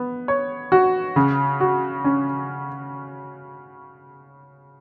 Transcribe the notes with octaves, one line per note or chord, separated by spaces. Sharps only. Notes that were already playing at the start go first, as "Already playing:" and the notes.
Already playing: B3
C#5
F#4
C#3
F#4
C#4